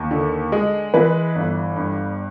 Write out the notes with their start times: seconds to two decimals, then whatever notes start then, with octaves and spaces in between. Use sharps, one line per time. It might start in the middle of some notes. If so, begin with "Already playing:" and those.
Already playing: D#2
0.11 D3
0.52 G#3
0.94 E3 B4
1.35 G1
1.76 G2